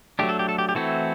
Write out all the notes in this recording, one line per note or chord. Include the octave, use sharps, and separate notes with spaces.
F#3 A3 D4 G4
A4
G4
A4
G4
G4
E3 A3 C4 E4 F#4 A4